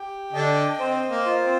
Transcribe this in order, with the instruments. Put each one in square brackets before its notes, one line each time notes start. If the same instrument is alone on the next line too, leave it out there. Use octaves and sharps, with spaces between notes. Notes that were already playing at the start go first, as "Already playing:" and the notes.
Already playing: [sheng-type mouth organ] G4 G5
[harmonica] D3 D4 [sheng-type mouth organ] D#5
[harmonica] C4 [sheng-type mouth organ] C5
[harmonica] A#3
[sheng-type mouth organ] F4
[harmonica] C4